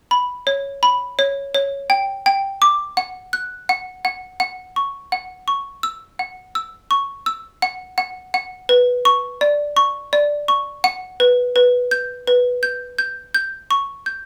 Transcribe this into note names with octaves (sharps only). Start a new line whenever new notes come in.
B5
C#5
B5
C#5
C#5
G5
G5
D6
F#5
F#6
F#5
F#5
F#5
C#6
F#5
C#6
E6
F#5
E6
C#6
E6
F#5
F#5
F#5
B4
C#6
D5
C#6
D5
C#6
F#5
B4
B4
G6
B4
G6
G6
G6
C#6
G6